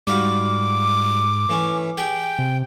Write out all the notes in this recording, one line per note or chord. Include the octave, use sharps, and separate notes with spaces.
G#2 G3 F4 F#4 D6
E3 A3 C#4
G4 G#4 G5
C3